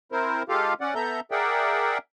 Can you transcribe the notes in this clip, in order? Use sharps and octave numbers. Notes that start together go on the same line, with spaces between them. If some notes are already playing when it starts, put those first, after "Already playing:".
C4 E4 A#4 C5
G#3 F4 G4 A4 F5
C#4 D5 F#5
B3 A4 E5 A#5 G6
G#4 A#4 D5 E5 F#5 G5